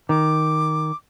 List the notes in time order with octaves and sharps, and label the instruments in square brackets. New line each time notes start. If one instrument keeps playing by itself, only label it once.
[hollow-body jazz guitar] D#3 [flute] D6